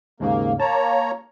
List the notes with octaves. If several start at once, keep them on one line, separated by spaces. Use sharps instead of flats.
D#2 G#2 C#3 A#3
A#3 C#5 A5 A#5